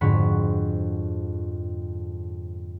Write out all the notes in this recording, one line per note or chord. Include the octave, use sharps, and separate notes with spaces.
F2 G#2 D3 F#4 C#5 B5